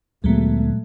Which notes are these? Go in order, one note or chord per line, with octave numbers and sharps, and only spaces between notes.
D2 A#2 F#3 G#3 A3 B3